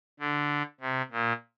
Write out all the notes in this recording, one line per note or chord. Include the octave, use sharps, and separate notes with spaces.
D3
C3
A#2